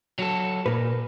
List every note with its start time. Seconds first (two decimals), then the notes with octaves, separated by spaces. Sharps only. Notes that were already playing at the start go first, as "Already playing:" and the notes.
0.19 F#3 F#4 A4
0.66 A#2 A#4 B4